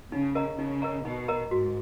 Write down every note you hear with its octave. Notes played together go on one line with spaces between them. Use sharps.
C#3 D#4
A#4 D#5 A#5
C#3 D#4
A#4 D#5 A#5
B2 D#4
A#4 D#5 A#5
G#2 F#4